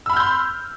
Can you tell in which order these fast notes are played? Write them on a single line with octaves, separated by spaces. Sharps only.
E6 B5 F6 G6 C6